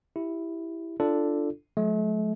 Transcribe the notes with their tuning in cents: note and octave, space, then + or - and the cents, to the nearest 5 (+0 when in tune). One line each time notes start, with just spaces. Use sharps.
E4 +0 G4 +0
D4 +0 F4 -30 A4 +0
F#3 -45 A3 -40